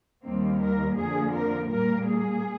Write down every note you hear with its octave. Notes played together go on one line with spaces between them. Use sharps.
D#2 D#3 G3 A#3 C4
A#4
F2 D3 F3 A#3 G#4
A#4
A#2 G3 A#3 A#4
G#4